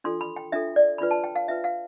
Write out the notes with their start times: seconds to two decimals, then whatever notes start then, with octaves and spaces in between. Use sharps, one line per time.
0.04 D4 F4 A4 C6
0.21 B5
0.36 G5
0.52 D4 F4 A4 E5
0.76 D5
0.98 D4 F4 B4 B5
1.11 A5
1.24 G5
1.36 F5
1.48 D4 F4 B4 E5
1.64 F5